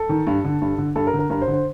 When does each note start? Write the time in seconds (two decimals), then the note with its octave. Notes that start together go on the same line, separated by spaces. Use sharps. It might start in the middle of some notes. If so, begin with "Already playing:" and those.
Already playing: A4
0.09 D#3
0.27 G2
0.45 D3
0.61 G2
0.78 D3
0.96 G2 A4
1.07 A#4
1.13 D3
1.19 A#4
1.30 G2 A#4
1.41 C5
1.48 D3
1.53 C5